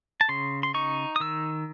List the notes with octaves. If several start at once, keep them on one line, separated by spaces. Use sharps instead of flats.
A5
C#3 C6
C6
D#4 C#6
D#6
D#3 E6